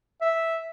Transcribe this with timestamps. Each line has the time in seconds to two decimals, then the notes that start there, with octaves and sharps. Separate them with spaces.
0.21 E5